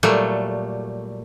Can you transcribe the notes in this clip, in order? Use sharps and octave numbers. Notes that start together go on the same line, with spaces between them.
A#2 F#3 G3 A3